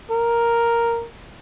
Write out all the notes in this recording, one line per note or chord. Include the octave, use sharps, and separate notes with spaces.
A#4